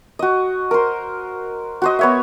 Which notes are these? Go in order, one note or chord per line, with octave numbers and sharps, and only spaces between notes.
F#4 D#5
A#4 C5
F#4 C5 D#5
B3 C#5 E5